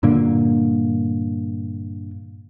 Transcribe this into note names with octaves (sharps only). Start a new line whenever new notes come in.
G2 A#2 D3 A#3